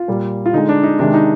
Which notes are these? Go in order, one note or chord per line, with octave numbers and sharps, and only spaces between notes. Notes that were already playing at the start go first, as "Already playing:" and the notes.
Already playing: F4
A#2 G3
F4
D3 G#3 D#4
D4
D#4
C3 D#3 G#3 D4
D#4